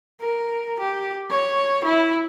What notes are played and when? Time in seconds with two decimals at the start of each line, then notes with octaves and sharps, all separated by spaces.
0.21 A#4
0.79 G4
1.30 C#5
1.84 E4